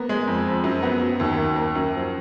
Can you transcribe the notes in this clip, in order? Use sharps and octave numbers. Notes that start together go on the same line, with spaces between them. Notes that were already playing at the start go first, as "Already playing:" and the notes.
Already playing: A#3 B3
G#3
F2
F3
F#2
B3
F#3
D#2
A#3
A#3
F#2
F3